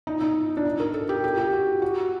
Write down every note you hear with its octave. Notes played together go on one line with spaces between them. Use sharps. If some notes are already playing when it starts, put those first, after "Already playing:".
D#4
D#4
D4
D#4
A#4
A4
G4
G4
G4
F#4
F#4